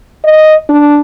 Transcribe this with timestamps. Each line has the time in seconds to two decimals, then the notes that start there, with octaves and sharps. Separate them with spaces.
0.24 D#5
0.70 D4